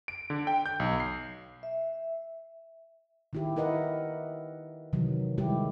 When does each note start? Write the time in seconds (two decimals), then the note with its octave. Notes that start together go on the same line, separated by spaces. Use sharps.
0.08 D7
0.30 D3
0.47 G5
0.66 G6
0.80 B1
1.00 C7
1.63 E5
3.33 D#3 E4 G4
3.56 E4 A#4 B4 D#5 F#5
4.93 C3 D#3 E3 F#3
5.38 D#3 G3 G#3 E4 G4